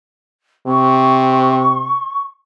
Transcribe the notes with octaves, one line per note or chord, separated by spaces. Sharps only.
C3 C#6